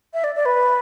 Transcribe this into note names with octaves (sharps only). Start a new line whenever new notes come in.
E5
D5
D5
B4